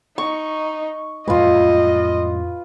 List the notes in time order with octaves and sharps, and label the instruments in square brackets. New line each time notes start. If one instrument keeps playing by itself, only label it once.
[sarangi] D#4 [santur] C#6
[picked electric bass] F2 A2 G#3 [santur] F4 B4 [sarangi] D#5